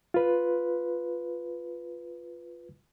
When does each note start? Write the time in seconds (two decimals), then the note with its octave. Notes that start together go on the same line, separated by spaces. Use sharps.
0.14 F4 B4